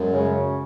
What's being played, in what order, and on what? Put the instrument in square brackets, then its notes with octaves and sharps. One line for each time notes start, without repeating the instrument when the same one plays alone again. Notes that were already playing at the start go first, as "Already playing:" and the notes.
Already playing: [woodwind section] F#2 [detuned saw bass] G#3
[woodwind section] C#3